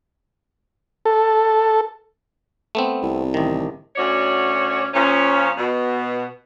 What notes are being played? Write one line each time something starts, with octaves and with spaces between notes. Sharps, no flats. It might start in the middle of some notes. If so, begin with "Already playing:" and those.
A4
A3 B3 C4
C2
A1 D#3
D2 C#4 F#4 C#5 D5
A#2 F3 C#4
B2